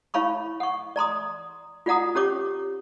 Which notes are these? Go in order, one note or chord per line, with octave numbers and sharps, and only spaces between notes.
E4 C#5 F5 B5 C#6
F#5 C#6
D5 A#5 C6 D#6
F4 F#4 D5 F#5 A#5 D#6
C#4 G4 C#5 D6